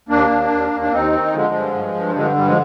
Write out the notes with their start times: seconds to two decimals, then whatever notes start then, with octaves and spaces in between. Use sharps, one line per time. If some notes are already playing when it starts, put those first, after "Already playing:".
0.09 D#2 A#3 D4
0.30 D#2
0.51 D#2
0.72 D#2
0.81 D4
0.91 D#2 C4 D#4
1.13 D#3
1.33 D3 F3 G#3
1.54 G2
1.74 G2
1.95 G2
2.15 D3 F3 G#3
2.25 G3
2.36 G2 G3
2.47 F3 G#3